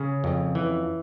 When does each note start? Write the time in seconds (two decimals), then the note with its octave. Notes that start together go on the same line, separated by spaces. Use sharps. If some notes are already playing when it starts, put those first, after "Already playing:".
Already playing: C#3 C#4
0.24 F2
0.55 E3